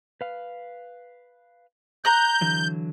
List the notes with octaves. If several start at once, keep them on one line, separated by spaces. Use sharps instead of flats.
B4 F5
A#5 F#6 G6
D3 E3 F#3